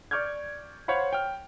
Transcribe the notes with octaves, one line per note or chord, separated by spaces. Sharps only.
D5 C#6 D6 F6 G6 G#6
C5 C#5 F5 F#5 B5
G5 F6